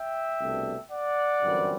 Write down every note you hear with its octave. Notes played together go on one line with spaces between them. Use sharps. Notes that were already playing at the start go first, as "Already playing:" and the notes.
Already playing: E5 G5
C2 B2 A3 D4
D5 F#5
G1 F#2 E3 G3 C4